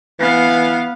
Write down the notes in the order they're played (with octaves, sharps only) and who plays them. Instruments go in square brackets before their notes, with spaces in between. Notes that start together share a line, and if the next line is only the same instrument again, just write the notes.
[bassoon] E3 [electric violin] B3 F5